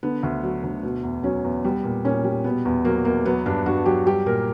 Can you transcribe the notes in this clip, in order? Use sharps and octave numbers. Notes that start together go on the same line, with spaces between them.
D3 B3
D2
F#3
D2
B2
E2
F#3 C#4
E2
G3 B3
A#2
A#2 C#4
G3
B2 B3
E2
F#3 A#3
E2 A#3
F#3 B3
G2 D4
G2 F#4
F#3 G4
G3 G4
A#2 A#4